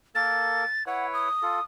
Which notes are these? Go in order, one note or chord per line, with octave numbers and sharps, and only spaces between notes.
A#3 A4 A#4 A6
E4 B4 C#5 F#5
D#6
F4 A4